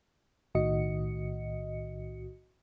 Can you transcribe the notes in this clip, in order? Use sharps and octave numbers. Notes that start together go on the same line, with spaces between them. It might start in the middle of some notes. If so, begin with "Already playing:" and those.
B1 A2 D#3 F#4 D#5 C#7